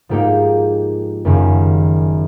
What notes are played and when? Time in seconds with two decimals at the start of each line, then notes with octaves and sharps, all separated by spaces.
0.09 G#2 F3 A#3 D#4 G4
1.25 F#1 F#2 D#3 G3 A#3